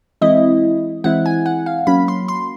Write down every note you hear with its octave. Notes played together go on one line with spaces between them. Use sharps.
E3 G#3 C4 E4 D#5
E3 G#3 C4 E4 F#5
G#5
F#5
F5
F#3 A#3 C#4 B5
C6
C6